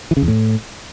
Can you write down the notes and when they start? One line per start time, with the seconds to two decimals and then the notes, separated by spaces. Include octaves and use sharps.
0.11 E3
0.17 C#3
0.22 E2
0.28 A2